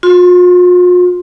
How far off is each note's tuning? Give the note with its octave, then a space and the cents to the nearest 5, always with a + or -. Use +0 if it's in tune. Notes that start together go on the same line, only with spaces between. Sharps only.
F4 +45 C6 +5